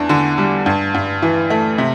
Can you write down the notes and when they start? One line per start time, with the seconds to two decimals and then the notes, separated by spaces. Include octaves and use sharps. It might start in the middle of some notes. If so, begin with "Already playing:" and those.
Already playing: E2 D4
0.09 D3
0.38 G3
0.66 G2
0.95 G2
1.22 E3
1.50 A3
1.78 C3